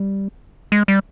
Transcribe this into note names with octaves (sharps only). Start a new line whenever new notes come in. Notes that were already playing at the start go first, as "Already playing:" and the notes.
Already playing: G3
G#3
G3